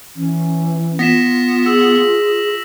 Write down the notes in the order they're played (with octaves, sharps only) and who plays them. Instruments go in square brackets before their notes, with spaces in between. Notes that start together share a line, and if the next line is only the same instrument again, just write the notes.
[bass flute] E3 [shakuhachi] C#4
[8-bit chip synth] B3 [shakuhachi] F4 [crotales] A#6 B6 E7
[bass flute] G#4 [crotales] E6